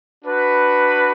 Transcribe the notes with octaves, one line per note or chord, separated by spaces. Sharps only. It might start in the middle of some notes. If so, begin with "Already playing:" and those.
D4 F#4 B4